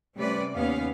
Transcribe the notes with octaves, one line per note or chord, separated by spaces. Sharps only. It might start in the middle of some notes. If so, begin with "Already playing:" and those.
C3 G3 A3 C#4 B4 D5
D#2 B3 C#4 F5